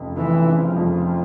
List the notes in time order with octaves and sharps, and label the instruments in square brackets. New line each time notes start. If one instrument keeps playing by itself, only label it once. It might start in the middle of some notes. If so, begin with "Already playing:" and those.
Already playing: [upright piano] F1 F2 C#3
[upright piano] F1 [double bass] E3
[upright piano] C#3
[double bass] F3
[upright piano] F2